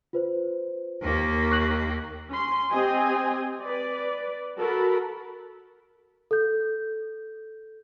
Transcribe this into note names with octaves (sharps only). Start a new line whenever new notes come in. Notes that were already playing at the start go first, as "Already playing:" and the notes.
F4 B4 C5
D#2 A#3
C#6 F#6 F#7
C#4 C6
C4 G4 D#5 G#5
B4 D5
F#4 A4 A#4 A5 B5
A4 G6